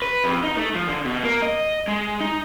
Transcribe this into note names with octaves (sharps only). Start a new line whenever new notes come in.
B4
F2
D#4
A3
F3
D3
B2
A#3
D#5
G#3
D#4